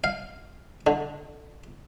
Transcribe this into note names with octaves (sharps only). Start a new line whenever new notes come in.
F5
D3